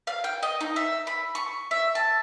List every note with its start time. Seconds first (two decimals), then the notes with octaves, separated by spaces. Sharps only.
0.07 F5
0.24 G5
0.43 D#5
0.61 D#4
0.76 E5
1.07 B5
1.35 C#6
1.71 E5
1.95 A5